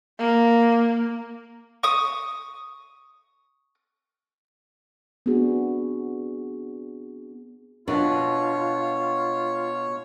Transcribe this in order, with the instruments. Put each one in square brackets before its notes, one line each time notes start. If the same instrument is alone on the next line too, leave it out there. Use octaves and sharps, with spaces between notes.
[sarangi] A#3
[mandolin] C#6 D#6
[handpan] B3 C4 D4 F#4 G#4
[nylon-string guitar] B2 D4 [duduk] F4 [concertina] C#5